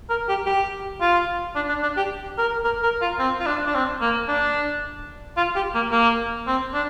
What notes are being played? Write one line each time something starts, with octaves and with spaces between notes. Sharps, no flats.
A#4
G4
G4
F4
D4
D4
D4
G4
A#4
A#4
A#4
F4
C4
F4
D4
D4
C4
A#3
D4
F4
G4
A#3
A#3
C4
D4